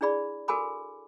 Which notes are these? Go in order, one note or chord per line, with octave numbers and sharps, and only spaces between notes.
D4 E4 G#4 D5 B5
F#4 A4 A#4 G#5 B5 D6